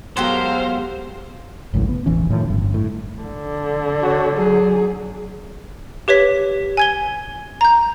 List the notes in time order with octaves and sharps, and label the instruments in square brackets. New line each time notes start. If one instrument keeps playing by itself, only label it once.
[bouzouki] F#3 G4 A4 [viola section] G#3 A#4 F5 [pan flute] B3 [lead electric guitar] C5
[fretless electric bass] G#1 C#2 F#2 A2
B3
E1 A1 E3 C#4
A2 D#3 F3
G1 G2
A2
[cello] D3
[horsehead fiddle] F#4 C#5
F#3 G#4
[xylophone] G4 B4 C#5 B6
G#5 G#6 G7
A#5 G6